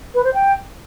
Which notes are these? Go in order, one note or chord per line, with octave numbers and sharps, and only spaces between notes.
B4
C5
G5